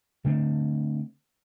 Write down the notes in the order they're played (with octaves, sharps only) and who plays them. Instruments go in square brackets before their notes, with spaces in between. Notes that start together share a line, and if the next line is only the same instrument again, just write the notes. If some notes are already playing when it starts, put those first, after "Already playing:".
[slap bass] D3 A3 C4